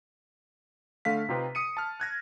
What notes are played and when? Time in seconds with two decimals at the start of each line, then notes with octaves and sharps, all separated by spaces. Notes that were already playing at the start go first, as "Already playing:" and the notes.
1.05 D3 A3 F5 B6
1.29 C3 D#4 F4 G4 B4
1.55 D#6 C#7 D#7
1.77 A5 F6
2.00 F#6 G#6 A#6